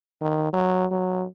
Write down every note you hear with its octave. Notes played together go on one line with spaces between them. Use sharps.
D#3
F#3
F#3